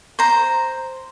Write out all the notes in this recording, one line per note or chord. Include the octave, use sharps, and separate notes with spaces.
C5 A#5